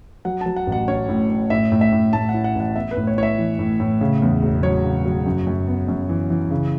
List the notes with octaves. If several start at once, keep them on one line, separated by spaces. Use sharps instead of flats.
F#3 F#5
F#3 A5
F#5
A1
F#5
C#4 C#5
A2
C#4
A2 E5
A2
E5
A2
A2 A5
F#5
E4
F#5
A1 F#5
B3 E5
B4
A2
C#5
E4 C#5
E5
E3
A2
A2
C#3
E2
E1
F#3 C#5
C#3
F#3
F#2
F#2
B3
F#2
E3
E3
C#3